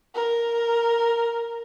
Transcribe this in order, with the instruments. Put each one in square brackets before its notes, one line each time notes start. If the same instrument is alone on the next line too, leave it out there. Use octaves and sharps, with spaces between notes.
[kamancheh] A#4